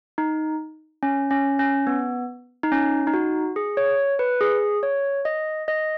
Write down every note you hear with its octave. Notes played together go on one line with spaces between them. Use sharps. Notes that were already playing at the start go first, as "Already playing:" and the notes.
D#4
C#4
C#4
C#4
B3
D#4
C#4
D#4
F#4
G#4
C#5
B4
G#4
C#5
D#5
D#5